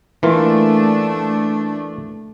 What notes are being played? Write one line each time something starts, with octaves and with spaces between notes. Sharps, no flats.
E3 A3 A#3 D4 F4